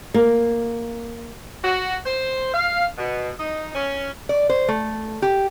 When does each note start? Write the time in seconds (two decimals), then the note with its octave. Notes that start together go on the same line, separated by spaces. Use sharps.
0.14 A#3
1.64 F#4
2.06 C5
2.54 F5
2.98 B2
3.39 D#4
3.75 C#4
4.29 D5
4.49 C5
4.68 A3
5.22 G4